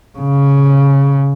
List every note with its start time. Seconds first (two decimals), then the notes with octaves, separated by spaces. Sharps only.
0.19 C#3